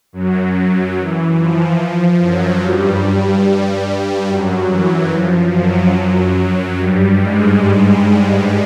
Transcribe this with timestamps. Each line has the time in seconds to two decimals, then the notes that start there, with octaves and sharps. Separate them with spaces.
0.13 F#2 F#3
0.96 E3
1.38 F3
1.79 F3
2.21 F#2 F#3
2.63 G2 G3
3.45 G2 G3
4.28 F#2 F#3
4.70 E3
5.12 F3
5.53 F#2 F#3
6.78 G2 G3
7.19 G#2 G#3